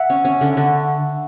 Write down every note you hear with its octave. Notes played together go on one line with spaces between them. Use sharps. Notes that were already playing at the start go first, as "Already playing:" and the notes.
Already playing: E5 F#5
C#4
C#4
D3
D3